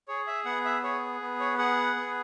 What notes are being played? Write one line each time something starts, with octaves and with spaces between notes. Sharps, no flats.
G#4 C#5
E5
B3 F#5
E5
G#4 C#5
B3
C#5
G#4 F#5
B3